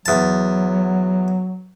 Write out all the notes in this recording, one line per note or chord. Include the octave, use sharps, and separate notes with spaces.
E2 F#3 A5